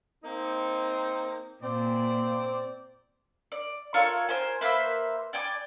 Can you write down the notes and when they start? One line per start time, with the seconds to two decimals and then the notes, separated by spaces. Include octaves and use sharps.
0.24 A#3 C4 D#4
1.63 A#2 C4 D5
3.52 D5
3.94 F4 A4 A#4 C#5
4.29 A#4 C5 G#5
4.61 A#3 B4 C5 E5
5.33 D5 G5 G#5 D6